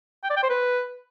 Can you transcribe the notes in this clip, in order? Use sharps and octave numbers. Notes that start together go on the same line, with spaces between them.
G5
D5
G5
C5
B4